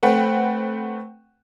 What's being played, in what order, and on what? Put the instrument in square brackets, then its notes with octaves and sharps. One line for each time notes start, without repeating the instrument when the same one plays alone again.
[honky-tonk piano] A3 C4 B4 F#5 G5